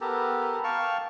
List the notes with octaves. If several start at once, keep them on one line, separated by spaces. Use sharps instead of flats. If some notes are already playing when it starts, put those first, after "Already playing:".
B3 G4 A4 A#4
F5 G5 A5 C#6